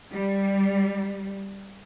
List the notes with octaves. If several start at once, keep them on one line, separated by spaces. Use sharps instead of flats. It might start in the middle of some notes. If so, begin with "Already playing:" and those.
G3